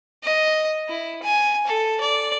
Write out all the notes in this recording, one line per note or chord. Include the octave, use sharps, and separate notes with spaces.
D#5
E4
G#5
A4
D5